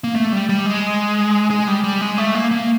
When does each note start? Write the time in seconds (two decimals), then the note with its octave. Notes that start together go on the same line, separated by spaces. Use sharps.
0.04 A#3
0.16 A3
0.32 G3
0.49 G3
0.66 G#3
1.51 G#3
1.68 G3
1.84 G3
2.01 G#3
2.18 A3
2.35 A#3
2.51 A#3